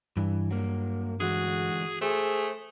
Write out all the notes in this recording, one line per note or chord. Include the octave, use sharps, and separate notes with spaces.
G2 E3
F#3 A#3
D3 E3 G#3 F#4 G#4
A3 G#4 C5